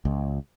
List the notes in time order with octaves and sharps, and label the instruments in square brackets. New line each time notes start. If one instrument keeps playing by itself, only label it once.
[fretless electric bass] C#2